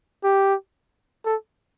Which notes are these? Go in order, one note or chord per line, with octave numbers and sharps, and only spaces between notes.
G4
A4